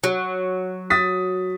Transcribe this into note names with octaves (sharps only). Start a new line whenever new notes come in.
F#3
D#6 A6 B6